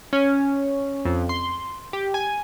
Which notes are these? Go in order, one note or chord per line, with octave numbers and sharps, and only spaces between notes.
C#4
F2
C6
G4
G#5